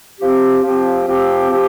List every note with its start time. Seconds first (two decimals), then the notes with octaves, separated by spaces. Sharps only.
0.20 F3 C4 G4
0.62 F3 C4 G4
1.07 F3 C4 G4
1.50 F3 C4 G4